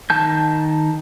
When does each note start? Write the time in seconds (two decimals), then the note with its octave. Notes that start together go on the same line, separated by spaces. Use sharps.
0.10 D#3 A5 G6